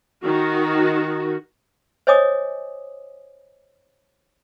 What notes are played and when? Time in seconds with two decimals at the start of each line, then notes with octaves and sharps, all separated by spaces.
0.24 D#3 F#4
2.07 C5 C#5 D#5 G#5 D6 D#6